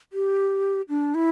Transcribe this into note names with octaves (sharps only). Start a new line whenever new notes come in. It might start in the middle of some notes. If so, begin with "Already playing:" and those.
G4
D4
E4